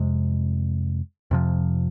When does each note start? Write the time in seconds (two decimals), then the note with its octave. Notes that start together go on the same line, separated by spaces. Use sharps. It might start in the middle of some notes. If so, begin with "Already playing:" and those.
Already playing: F2 C3 G#3
1.31 F2 C3 F3